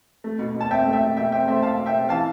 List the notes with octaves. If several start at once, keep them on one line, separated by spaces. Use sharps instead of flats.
A3
B2
B2
A5
C4 E5 G5
A3
E5 G5
B2
B2 E5 G5
C4 E5 G5
A3 C5 E5
B2 F5 A5
B2
E5 G5
C4
E3 F5 A5